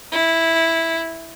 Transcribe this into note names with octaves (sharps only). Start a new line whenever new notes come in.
E4